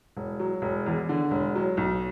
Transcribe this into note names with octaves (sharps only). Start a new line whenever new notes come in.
E1
F#3
E1
E2
D3
E1
F#3
B1